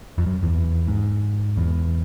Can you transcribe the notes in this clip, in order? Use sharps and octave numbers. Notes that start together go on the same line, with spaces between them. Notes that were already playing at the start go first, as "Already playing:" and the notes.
F2
F#2
E2
G#2
E2